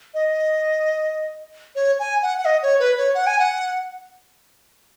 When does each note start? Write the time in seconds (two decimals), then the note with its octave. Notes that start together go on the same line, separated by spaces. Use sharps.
0.14 D#5
1.75 C#5
1.99 G#5
2.22 F#5
2.38 F#5
2.45 D#5
2.63 C#5
2.80 B4
2.97 C#5
3.15 F#5
3.27 G#5
3.39 F#5